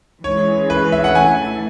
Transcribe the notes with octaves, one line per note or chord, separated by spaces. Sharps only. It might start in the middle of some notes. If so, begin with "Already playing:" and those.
E3 G#3 C#4 E4 G#4 C#5
B4
E5
F#5
E3 A3 E4 A4 G#5